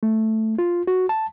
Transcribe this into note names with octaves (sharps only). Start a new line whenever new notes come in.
A3
F4
F#4
A5